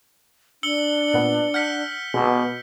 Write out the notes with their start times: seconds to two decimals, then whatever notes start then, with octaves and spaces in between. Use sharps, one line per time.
0.63 D4 E6 C#7 G7
1.14 A#2 B3
1.54 F#5 F6 G6 B6
2.14 B2 G#3 B3